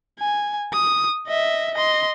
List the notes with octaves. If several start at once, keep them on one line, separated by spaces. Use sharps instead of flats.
G#5
D#6
D#5 E5
D#5 C6